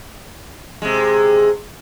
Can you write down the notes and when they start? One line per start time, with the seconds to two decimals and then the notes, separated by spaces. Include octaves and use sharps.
0.82 C3 G#3